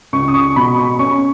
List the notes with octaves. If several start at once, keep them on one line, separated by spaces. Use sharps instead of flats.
C#2 C#6
D#6
C#6
B2 B5
C#6
C#4 C#6